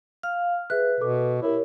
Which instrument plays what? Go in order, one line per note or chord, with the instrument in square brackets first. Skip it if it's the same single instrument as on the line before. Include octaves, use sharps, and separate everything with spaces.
[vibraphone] F5 [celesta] F6
[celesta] G#4 E5 F#6 [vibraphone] B4
[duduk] B2 [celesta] A4 D6
[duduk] E4 [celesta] G4 A#4 C#5